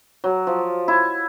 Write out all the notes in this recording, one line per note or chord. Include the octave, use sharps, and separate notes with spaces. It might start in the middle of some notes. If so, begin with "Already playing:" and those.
F#3
F3
E4